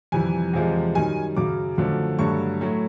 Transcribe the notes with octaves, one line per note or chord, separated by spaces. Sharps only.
F2 C3 E3 G3 G#5
E2 C3 F3 G#3
F#2 D#3 G3 G#5
F#2 C#3 F#3 D6
F#2 D3 F3 A3
G2 D3 F#3 A3 C#6
A2 F#3 A3